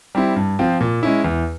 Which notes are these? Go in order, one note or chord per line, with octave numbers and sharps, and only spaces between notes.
G3 C4 E4
G2
F3 C4 F4
A#2
G#3 C#4 E4
E2